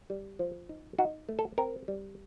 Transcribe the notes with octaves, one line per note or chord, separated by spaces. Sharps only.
G3
F3
D#4
D#4 F#4
A3
A4
C4 A#4
G3